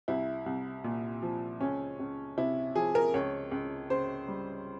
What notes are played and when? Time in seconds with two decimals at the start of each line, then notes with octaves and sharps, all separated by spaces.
0.08 C2 E4
0.46 C2
0.84 A#2
1.22 F3
1.60 C#2 C#4
1.99 C#2
2.37 C3 E4
2.75 F3 G#4
2.95 A#4
3.14 C#2 C#5
3.51 C#2
3.90 C#3 C5
4.28 G3